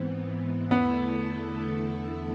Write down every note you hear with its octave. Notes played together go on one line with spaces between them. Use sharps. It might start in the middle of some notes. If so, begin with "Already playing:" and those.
Already playing: G#2 E3 B3 C4
E2 D3 A3 B3 E4 A4